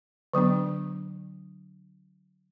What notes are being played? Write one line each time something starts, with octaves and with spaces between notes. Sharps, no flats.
D3 F#3 B3 D4